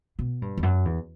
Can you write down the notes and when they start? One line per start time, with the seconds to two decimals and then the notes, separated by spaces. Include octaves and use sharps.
0.19 B2
0.42 G2
0.57 E2
0.63 F#2
0.85 E2